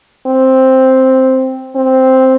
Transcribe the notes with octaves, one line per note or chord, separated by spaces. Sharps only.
C4
C4